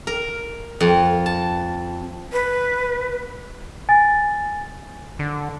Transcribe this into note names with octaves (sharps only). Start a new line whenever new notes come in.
A#4
F2
A5
B4
G#5 A6
D3